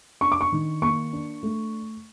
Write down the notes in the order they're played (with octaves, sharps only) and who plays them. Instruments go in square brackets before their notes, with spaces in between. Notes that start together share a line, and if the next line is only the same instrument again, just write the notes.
[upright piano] D4 C#6
D6
C#6
D#3
A#3 C#6
D4
A3